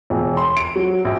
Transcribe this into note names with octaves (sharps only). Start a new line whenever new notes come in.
E1
C6
D7
F#3
A#1